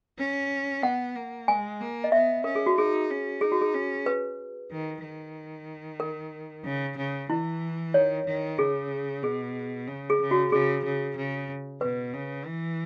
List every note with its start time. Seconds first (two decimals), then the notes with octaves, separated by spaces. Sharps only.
0.18 C#4
0.83 B3 F#5
1.16 A#3
1.48 G#3 G#5
1.80 A#3
2.04 D#5
2.12 B3 E5
2.44 C#4 A#4
2.55 G#4
2.66 F#4
2.77 D#4 G#4
3.10 C#4
3.41 D#4 G#4
3.52 F#4
3.61 G#4
3.74 C#4
4.06 B4
4.71 D#3
5.03 D#3
6.00 A#4
6.64 C#3
6.97 C#3
7.30 E3 E4
7.94 D#3 C#5
8.26 D#3
8.59 C#3 G#4
9.23 B2 G#4
9.88 C#3
10.10 G#4
10.21 C#3
10.31 F#4
10.52 C#3 G#4
10.84 C#3
11.16 C#3
11.81 B2 B4
12.14 C#3
12.46 E3